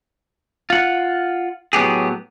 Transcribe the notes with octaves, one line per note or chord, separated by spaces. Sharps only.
F4 F#5
A2 F#3 B3 G4 G#4